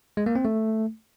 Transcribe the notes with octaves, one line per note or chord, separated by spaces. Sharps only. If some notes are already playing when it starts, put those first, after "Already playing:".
G#3
A#3
C4
A3